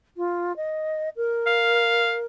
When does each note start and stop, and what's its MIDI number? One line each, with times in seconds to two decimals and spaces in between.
0.17 0.55 65
0.56 1.09 75
1.16 2.26 70
1.47 2.16 77